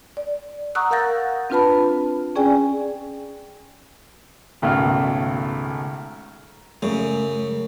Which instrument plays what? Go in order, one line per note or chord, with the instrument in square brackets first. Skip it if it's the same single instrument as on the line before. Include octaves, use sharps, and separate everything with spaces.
[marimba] D5
F#5 A#5 C#6 D#6 E6 F#6
A#4 F5 F#5 G6 A6 A#6
C4 D4 F4 B4 A5 B5
C#4 G#4 D5 G5 G#5
[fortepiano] G#1 C#2 B2 A3 A4 F6
[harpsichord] F#2 C#3 [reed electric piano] G#3 A3